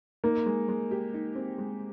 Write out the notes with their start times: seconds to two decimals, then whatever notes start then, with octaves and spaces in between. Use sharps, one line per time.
0.24 A#3 D#4
0.46 G#3
0.68 G#3
0.91 G4
1.14 D#4
1.35 C4
1.58 G#3